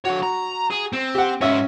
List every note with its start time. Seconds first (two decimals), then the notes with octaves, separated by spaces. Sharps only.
0.05 D3 F#4 C#5
0.23 A#5
0.71 G#4
0.93 C4
1.15 G4 F#5
1.41 G#2 C#4 F#4 E5